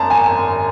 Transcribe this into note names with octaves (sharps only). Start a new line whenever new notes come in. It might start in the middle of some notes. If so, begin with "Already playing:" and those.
Already playing: G#1 F#2 A5 A#5
G#5